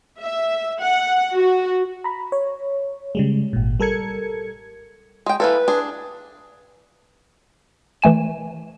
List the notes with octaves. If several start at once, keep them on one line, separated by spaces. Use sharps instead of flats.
E5
F#5
F#4
A#5 B5
C#5
C#3 G3 G#3
G#1 A#2
G3 A4 A#4 G#6 C#7
G#3 G5
E3 A#3 A4 B4
D4 G#4
E3 A3 G#5 E7